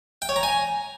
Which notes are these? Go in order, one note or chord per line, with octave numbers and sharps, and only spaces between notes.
G5
C#5
A#5
G#5